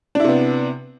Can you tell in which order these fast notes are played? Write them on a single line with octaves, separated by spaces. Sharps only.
D4 E4 C3 B3